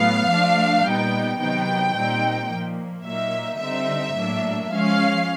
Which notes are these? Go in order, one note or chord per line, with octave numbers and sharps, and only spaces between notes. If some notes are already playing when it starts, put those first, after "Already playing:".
Already playing: A2 F#3 B3 F5
F3 A3 D4
A#2 G3 B3 D#4 G5
C3 D#3 F#3 B3 D#4 G5
A#2 G3 C4 D#4
A#2 F3 A#3
A#2 F#3 A#3 D#4 E5
D3 G3 C4 D#4 E5
A2 F#3 A#3 D4
F3 G#3 C#4 F5